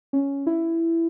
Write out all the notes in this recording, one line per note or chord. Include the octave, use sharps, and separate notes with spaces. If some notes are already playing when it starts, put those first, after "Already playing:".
C#4
E4